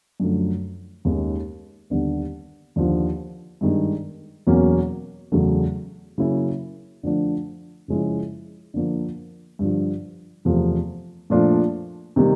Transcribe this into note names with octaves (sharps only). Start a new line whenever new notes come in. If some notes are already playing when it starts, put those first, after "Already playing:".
F#2 D3 F3 A3
D#2 D#3 G#3 C#4
D#2 D3 G3 B3
D#2 D3 F3
G2 D#3 G#3
E2 B2 F#3 A#3 C#4
E2 C#3 F#3 A3
C#3 F#3 A#3 C#4 E4
D3 F3 A3 D4
C#3 F3 G#3 C#4 E4
D3 F3 A#3 D4
G2 D3 F3
E2 C3 F3 A3
A#2 F3 A3 D4 F4
C3 D#3 G3 A#3